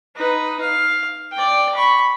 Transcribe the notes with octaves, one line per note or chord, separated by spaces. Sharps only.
D#4 B4
F5
D5 G5
B5 C#6